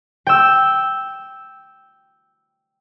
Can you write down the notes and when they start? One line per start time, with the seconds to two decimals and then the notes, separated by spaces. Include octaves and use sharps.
0.27 G5 E6